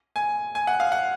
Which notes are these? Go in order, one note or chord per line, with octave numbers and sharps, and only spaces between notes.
G#5
G#5
F#5
F5
F#5